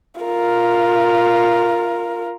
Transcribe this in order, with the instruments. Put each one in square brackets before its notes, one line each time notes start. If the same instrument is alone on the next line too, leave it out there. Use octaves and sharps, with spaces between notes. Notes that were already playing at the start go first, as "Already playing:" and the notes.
[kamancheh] F4 A#4